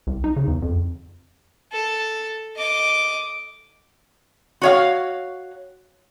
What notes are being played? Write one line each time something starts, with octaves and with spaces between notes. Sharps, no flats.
C2
D#4
C#3
E2
F2
A4
D#5 D6
F#4 C#5 F5